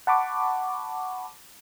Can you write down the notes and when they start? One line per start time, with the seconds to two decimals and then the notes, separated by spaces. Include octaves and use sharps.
0.07 F#5 A5 B5 C#6 D6